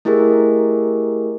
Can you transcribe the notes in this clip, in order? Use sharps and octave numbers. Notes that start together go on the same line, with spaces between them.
A3 E4 G4 G#4 A#4